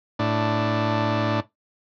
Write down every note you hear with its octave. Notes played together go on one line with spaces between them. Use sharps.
A2 D4